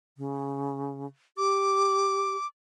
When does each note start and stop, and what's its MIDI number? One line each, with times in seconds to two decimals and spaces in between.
0.18 1.06 49
1.38 2.36 67
1.38 2.47 86